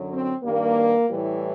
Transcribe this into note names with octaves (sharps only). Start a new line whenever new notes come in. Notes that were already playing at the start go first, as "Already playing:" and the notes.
Already playing: F#2 D3 F#3
C4
G2 D#3 G3 A#3
A2 E3 G3